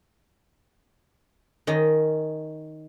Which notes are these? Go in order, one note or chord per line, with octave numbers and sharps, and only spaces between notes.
D#3 C#4 D#5